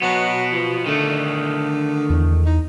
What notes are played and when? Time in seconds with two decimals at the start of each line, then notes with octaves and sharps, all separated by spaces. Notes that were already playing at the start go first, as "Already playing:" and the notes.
0.02 B2 F#3 B3
0.52 F3
0.86 D3 D#3 A3
2.10 E2
2.46 D#4